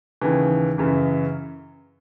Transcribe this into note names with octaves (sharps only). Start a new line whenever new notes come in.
D#2 C#3 E3
F#2 C#3 E3